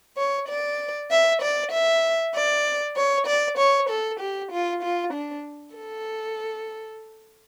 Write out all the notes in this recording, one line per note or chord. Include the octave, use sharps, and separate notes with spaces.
C#5
D5
E5
D5
E5
D5
C#5
D5
C#5
A4
G4
F4
F4
D4
A4